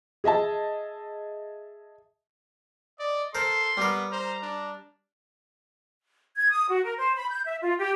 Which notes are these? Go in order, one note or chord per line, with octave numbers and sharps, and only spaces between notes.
G#4 D#5 E5 A5
D5 D#5
A4 A#4 C5 C6
G3 B3 A#4
C5 A#5
D4
G#6
D#6
F#4
A#4
C5
B5
G6
E5
F4
G4